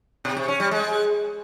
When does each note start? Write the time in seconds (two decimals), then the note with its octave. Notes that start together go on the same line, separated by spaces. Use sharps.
0.25 B2
0.37 C3
0.48 C#4
0.60 G3
0.71 G#3